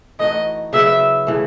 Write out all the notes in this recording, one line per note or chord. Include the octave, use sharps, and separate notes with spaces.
E3 A3 D#4 F#4 D#5
C#3 F#3 B3 E4 E5
C#3 E3 A3